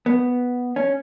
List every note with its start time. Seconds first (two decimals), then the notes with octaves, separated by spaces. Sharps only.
0.06 B3
0.76 C#4